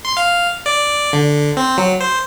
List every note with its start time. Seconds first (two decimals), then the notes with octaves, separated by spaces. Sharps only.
0.05 C6
0.17 F5
0.66 D5
1.13 D3
1.57 C4
1.78 F#3
2.01 C5